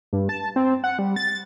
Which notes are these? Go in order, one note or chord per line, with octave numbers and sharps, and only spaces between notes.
G2
A5
C4
F#5
G3
A6